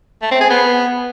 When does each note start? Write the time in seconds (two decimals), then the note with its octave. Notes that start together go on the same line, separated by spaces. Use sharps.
0.22 A3
0.32 C4
0.41 G#4
0.50 B3